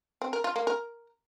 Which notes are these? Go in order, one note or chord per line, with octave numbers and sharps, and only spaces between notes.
C4
A#4
F4
A#3
A#4